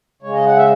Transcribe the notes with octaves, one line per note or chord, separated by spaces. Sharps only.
C#3 G#3 C#5
D#5
F#5
E5